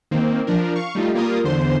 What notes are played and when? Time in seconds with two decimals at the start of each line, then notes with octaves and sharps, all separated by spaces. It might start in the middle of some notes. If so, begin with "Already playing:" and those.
0.11 D#3 A#3 C4
0.47 F3 D4 A#4
0.75 F5 C#6
0.95 G3 A3 D#4 F4
1.14 G3 A#3 F4 A#4 D#6
1.44 E2 D3 C5 C6